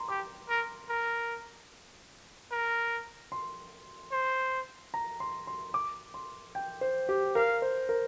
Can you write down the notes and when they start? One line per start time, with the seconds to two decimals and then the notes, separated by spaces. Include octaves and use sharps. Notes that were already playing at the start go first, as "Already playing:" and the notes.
Already playing: A#5 C6
0.08 G4 D6
0.49 A#4
0.89 A#4
2.51 A#4
3.32 C6
4.12 C5
4.94 A#5
5.20 C6
5.47 C6
5.74 D6
6.14 C6
6.55 G5
6.81 C5
7.09 G4
7.35 A#4 F5
7.62 C5
7.89 A#4